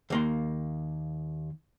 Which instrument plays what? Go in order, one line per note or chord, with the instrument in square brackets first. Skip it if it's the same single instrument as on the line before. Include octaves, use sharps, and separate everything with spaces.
[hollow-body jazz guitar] D#2 A#3 C6